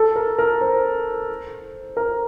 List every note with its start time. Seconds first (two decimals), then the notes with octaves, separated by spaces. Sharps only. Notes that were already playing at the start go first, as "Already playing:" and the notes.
Already playing: A4
0.16 A#4
0.38 A#4
0.61 C5
1.97 A#4